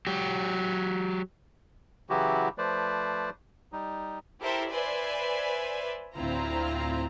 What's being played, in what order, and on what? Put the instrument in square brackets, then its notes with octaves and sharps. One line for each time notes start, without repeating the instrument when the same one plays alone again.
[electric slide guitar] F#3 G4
[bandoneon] C#3 E3 F#3 E4 F#4 G4
F3 A3 B4 C5 D5
G3 D#4
[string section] E4 G4 A4 A#4 C5 E5
B4 C5 D5 E5 G#5
D2 A2 C4 E4 F4 A#5